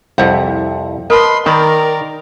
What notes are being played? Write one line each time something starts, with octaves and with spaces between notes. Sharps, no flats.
C2 F2 E4 C5 F#5
A#4 B4 D#5 A5 B5 C6
D#3 D#4 A#4 D5 B5